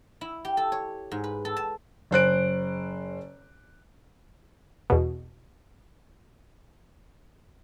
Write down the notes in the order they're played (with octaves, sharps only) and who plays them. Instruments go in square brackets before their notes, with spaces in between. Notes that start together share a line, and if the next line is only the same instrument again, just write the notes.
[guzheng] E4
G4
A4
C#5
G#2
B4
A4
A5
[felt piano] F#1 C5 F#6 D7
[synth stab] E2 B2